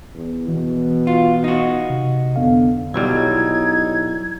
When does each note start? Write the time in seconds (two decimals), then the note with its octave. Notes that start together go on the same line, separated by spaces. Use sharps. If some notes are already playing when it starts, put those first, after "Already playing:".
0.14 E2
0.48 B2 E3
1.07 F4
1.44 D#4 F#4
1.90 C3
2.36 F2 D3 B3 F5
2.94 B1 F#3 G3 D#4 E4 G#6